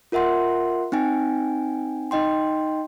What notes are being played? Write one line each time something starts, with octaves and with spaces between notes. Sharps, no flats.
F4 A#4 E5 F#5 C6
C4 D#4 G5 G#5
D#4 D#5 G5 C6